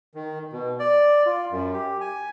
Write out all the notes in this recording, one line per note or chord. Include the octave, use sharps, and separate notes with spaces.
D#3
B2
D5
F4
F#2
G4
G#5